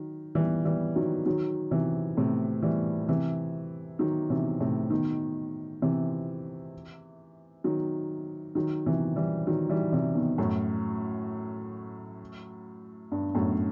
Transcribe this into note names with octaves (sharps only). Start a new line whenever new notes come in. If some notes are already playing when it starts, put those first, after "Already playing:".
Already playing: D#3 F#3
E3 G3
E3 G3
D#3 F#3
D#3 F#3
C3 E3
A2 C3
E3 G3
C3 E3
D#3 F#3
C3 E3
A2 C3
B2 D#3
C3 E3
D#3 F#3
D#3 F#3
C3 E3
E3 G3
D#3 F#3
E3 G3
C3 E3
B2 D#3
F#2 A2
G2
F#2 A2